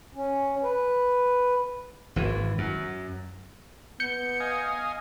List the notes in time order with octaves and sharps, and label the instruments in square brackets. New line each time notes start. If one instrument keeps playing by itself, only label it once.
[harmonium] C#4
B4
[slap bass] G#1 E3
F#2
[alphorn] B3 [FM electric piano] G6 C#7
[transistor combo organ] D#5 F5 G#5